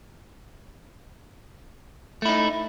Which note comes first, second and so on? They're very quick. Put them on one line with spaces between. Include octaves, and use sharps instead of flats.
A3 E4 D#4